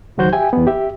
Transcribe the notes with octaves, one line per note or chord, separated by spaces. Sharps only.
C#2 D#3 F#3 F#4 C5 G6
G4 E5 G5 G#5
E2 B3
G4 E5